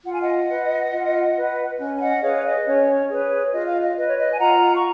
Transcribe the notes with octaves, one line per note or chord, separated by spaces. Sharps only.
F4 F#5
G#5
D#5 F#5
B4
F4
B4
C#4
G#5
D#5 F#5
G#4 B4 C#5 F5
C#5
D#5
C#4 C#5
G#4 B4 C#5
F4 D#5
F5
D#5
B4 D#5
C#5
D#5
G#5
F4 F#5 A#5
C#6